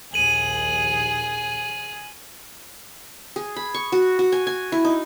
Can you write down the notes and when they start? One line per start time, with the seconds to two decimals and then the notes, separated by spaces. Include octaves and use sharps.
0.14 A#1 D#2 G#4 D#7 F#7
3.36 G#4
3.56 B5
3.74 C#6
3.92 F#4
4.19 F#4
4.32 G#5
4.47 G#5
4.72 E4
4.85 D#4